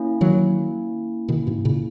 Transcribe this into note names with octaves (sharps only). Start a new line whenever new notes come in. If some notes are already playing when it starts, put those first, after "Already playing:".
Already playing: A#3 C#4 E4
D#3 F#3
B2 D#3
G#2 B2
A#2 C#3